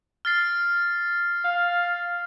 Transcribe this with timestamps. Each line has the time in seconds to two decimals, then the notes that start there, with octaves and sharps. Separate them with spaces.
0.25 F6 A6 C7
1.45 F5